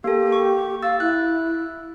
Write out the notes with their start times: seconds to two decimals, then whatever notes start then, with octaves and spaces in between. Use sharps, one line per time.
0.04 A#3 G4 A4
0.32 C#6
0.83 F5 E6 A6
1.00 E4 F#6